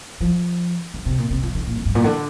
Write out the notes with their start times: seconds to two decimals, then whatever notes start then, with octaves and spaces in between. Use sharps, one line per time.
0.20 F3
0.94 D3
1.06 C3
1.18 A#2
1.31 C3
1.43 F3
1.55 D3
1.67 A#2
1.77 F2
1.86 G2
1.95 A#2
2.04 D3